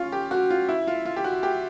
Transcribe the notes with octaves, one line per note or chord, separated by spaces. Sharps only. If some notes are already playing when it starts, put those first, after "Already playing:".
Already playing: C#4 F4
G4
F#4
F4
E4
F4
F4
G4
F#4
G4